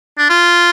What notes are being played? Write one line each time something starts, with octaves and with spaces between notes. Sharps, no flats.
D4
F4